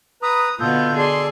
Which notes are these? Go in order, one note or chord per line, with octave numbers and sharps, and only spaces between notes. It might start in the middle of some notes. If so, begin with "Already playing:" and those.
B4 A#5 B5 D#6
B2 D3 B3 F4 A4 G6
G#4 D5 A5 C6